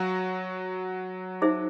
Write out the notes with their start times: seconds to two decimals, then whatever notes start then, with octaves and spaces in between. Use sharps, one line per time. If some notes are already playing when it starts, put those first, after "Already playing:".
Already playing: F#3 F#4 F5 A#5
1.42 D#4 G#4 C5 E5